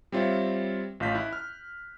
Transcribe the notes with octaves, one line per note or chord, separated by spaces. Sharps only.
G3 C4 F4 C#5 E5
A1 F4 F5 G6 B6
E4 F#6
F6